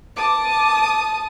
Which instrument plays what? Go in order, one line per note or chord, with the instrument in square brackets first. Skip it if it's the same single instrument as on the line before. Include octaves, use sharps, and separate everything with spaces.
[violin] A5 D#6 [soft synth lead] D6